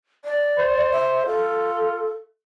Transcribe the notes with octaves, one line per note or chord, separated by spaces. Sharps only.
D5
C5
E5
F4 A4